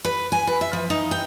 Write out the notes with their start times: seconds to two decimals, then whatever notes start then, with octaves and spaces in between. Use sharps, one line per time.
0.05 B4
0.32 G#5
0.47 B4
0.61 E5
0.73 F3
0.90 D#4
1.11 G5